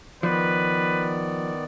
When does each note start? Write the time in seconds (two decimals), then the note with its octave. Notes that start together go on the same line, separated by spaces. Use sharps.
0.23 D#3 F3 B3 B4 D5